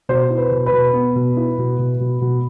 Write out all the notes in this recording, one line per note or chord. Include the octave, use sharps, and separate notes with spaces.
B2 C5
E4
B4
B2
B4
B2
B3
B2
E4
B2
B2
B2
B2